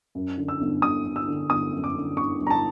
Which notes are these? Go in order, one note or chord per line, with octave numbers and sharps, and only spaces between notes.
F#2
D3
E6
G1
G1 D#6
G1
E6
D3
G1 D#6
F#2
D6
D3
G1 C#6
G1
A#5
A5